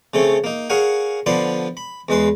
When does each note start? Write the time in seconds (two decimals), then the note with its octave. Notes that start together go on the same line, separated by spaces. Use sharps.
0.14 C#3 A3 C4 A4 C#5
0.44 A#3 D#4
0.70 G#4 A#4 C#5 F5 F#5 G#5
1.26 D3 F3 B3 D5 B5 C6
1.77 B5
2.09 E2 G#3 B4 C6